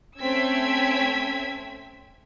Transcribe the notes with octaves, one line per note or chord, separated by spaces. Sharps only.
A3 C4 C#4 E6 G#6 B6